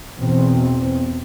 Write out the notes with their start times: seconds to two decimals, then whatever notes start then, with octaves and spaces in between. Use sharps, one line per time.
0.18 E2 B2 C4